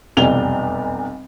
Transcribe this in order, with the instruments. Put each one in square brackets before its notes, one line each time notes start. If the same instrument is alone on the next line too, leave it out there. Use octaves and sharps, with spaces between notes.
[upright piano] F1 B1 E2 G3 F7 G7